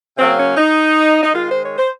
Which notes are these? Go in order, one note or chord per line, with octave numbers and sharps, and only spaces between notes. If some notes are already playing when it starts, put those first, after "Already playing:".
C#3 F#3 A#3 C4
C#4
D#4
D#4
D#3 G#3 F4
C5
C#5
C5